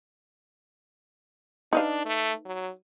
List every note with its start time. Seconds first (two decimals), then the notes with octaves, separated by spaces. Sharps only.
1.73 D4 D#4 B4 F5
2.06 A3
2.46 F#3